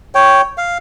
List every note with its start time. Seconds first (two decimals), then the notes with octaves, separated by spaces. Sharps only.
0.15 C#5 G5
0.58 F5